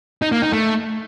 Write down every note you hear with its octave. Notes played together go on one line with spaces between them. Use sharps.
D#4
A#3
D#4
A3